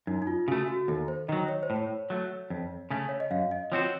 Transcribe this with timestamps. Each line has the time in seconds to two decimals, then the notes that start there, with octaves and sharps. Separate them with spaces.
0.07 F#2 D#4
0.22 D#4
0.27 F4
0.48 C#3 A3 F#4
0.68 F#4
0.88 D#2 A4
1.08 C5
1.28 D#3 F#3 D#5
1.49 C#5
1.63 C5
1.70 A2
1.76 C#5
2.10 F#3 A3
2.50 F2
2.90 C#3 A3 C#4
3.09 C#5
3.20 D#5
3.31 F#2 F5
3.51 D#5
3.72 F3 C4 F#4 C5 C#5